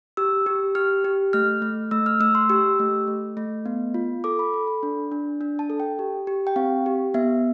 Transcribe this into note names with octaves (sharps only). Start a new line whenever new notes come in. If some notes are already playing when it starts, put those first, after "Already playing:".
G4 E6
G4
G4 F6
G4
A3 F6
A3
A3 E6
F6
A3 E6
C6
G4 E6
A3
A3
A3
B3
F4
A4 D6
B5
A4
B5
D4
D4
D4
A5
A4
G5
G4
G4
G5
C4 F5
G4
B3 E5